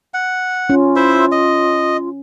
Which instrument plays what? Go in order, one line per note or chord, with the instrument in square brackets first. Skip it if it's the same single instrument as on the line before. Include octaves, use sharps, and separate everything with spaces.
[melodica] F#5
[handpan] C#4 [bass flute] F4
[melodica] E4 C5 E5
D#5